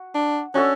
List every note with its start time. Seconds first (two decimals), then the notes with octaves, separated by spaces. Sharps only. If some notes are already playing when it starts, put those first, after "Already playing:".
Already playing: F#4
0.15 D4
0.54 C#4 D4 F#4 A4 E5